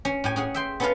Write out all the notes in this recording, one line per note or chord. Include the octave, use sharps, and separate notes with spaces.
C#4
A2 G4 G#5
C#4 G#4 F#5
E5 G5 C6
B3 C#4 E4 A4 B4 F5